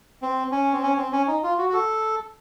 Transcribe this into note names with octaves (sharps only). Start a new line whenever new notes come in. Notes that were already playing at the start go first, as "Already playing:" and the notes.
C4
C#4
C4
C#4
C4
C#4
D#4
F4
F#4
F#4
A4